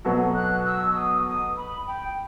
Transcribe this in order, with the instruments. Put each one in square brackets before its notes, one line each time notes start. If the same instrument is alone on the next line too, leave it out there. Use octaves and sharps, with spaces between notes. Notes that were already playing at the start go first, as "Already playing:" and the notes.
[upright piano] B2 F#3 B3 F#4 A4
[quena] F#6
E6
D#6
D#6
B5
G5